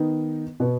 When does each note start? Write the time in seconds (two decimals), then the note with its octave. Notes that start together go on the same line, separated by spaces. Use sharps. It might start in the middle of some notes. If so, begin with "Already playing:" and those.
Already playing: D#3 B3 D#4
0.60 B2 B3